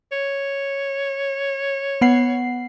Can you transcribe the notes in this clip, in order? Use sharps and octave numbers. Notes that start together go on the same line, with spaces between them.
C#5
B3 F#5 C7